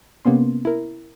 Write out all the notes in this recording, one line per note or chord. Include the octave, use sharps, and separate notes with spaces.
C3 A#3 B3 C#4 C6
E4 A#4